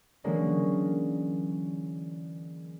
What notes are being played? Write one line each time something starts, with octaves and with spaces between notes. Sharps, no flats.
D3 E3 F#3 G#3 A#3 C#4